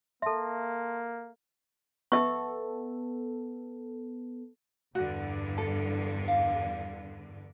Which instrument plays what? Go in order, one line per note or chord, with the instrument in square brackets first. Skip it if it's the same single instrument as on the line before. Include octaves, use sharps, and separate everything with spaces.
[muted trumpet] A#3 [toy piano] A4 E5 [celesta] A5 C6
[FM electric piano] B3 A4 [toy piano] E5 C#6
[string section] E2 G2 D3 [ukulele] F#4
[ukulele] A4
F5